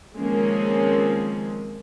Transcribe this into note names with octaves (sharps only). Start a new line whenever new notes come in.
D#3 F3 G#3 A#3 C4 C#4